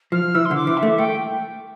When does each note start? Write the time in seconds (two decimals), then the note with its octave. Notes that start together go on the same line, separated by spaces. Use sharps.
0.12 F3 F6
0.34 E3 E6
0.45 C6
0.51 D3
0.56 D6
0.67 E3
0.77 E5
0.83 A3
0.98 A3 G5